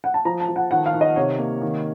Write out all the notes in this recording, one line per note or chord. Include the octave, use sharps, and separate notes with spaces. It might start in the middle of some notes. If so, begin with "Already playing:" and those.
F#5
A5
F3 A#5
A5
F3
F#5
D#3 F#5
F5
D#3
D#5
C3 C#5
A#3
D#3